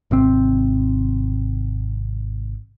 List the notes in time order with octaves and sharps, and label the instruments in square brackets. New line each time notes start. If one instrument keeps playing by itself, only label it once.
[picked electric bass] G#1 C3 C4